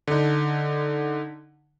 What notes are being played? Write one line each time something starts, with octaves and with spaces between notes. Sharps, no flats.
D3 D#4